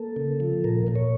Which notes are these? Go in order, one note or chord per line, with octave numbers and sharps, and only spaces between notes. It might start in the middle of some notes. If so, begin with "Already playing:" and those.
Already playing: A#3 A4
C#3
F3
A#2 A#4
A#2 A#4
C#5